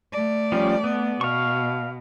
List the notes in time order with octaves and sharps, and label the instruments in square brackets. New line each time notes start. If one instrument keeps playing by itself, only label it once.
[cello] A3 D5
[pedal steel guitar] F3 G3 C#4
B3
[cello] B2 [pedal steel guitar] F5 C#6